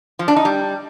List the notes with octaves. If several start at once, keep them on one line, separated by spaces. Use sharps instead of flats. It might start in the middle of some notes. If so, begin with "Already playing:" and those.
F3
D4
D#4
G3